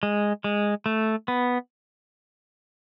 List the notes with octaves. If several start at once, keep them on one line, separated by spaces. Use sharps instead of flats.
G#3
G#3
A3
B3